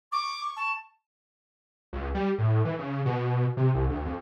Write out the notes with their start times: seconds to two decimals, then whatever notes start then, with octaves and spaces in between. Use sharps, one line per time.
0.12 C#6 D6
0.56 A5
1.93 C#2
2.15 G3
2.38 A2
2.65 E3
2.79 C#3
3.06 B2
3.57 C3
3.75 C2
3.89 D2
4.05 F2